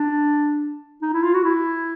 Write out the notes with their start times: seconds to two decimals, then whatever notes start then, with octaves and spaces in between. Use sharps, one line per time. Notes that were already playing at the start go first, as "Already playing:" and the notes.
Already playing: D4
1.02 D#4
1.13 E4
1.23 F4
1.34 F#4
1.44 E4